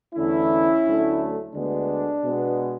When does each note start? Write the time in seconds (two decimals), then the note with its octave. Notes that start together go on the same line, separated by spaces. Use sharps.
0.14 E2 D3 A3 C#4 E4
0.84 D2 D3 F#3 A3
1.54 D2 D3 G#3 B3 D4
2.24 B2 G#3 B3